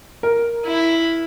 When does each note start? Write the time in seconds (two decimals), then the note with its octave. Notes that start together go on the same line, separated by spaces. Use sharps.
0.23 A#4
0.66 E4